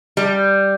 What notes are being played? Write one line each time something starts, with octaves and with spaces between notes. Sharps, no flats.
G3